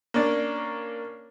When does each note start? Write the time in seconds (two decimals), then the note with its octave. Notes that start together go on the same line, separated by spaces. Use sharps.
0.14 A#3 C#4 D4 D5